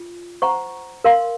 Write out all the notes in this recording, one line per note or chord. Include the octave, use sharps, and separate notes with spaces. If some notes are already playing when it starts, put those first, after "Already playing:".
Already playing: F4
C5 F#5 A#5 C#6
A#4 F5 C6